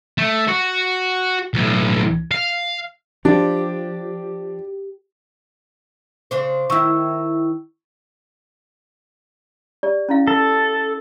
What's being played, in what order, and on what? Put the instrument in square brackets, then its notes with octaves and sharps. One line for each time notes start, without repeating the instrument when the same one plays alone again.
[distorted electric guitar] A3
F#4
B1 A2
F5
[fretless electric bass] F3 [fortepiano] D4 [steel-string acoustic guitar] G4
[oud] C#3 D4 C5
[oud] D#3 E4 [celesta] C#6 E6
[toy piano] G4 D5
C#4 E4 F5
[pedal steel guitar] A4